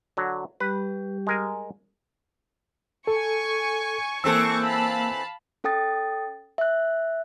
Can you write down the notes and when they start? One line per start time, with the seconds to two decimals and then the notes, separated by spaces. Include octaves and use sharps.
0.17 D3 F#3
0.60 G3 G4 B4
1.27 G#3 A#4 G#5
3.07 A4 G#5 C#6
4.24 E3 A#3 C4 A4 A5 C#6 E6
4.62 F5 A5 B5
5.64 C#4 A4 G5 D#6 A6
6.58 E5 F#6